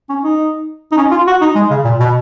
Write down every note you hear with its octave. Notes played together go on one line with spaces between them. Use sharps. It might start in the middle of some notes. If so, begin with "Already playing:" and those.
C#4
D#4
D#4
C#4
F4
F#4
D#4
G#3
C#3
A#2
B2